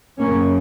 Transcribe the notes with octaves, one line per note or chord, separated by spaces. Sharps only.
F#2 C#3 A#3 C#4